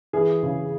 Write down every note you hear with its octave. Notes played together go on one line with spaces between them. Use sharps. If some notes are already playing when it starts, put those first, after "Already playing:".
E3 G#4
C#3